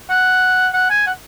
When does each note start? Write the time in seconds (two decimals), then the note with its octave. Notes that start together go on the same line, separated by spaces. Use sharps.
0.10 F#5
0.73 F#5
0.90 G#5
1.07 F#5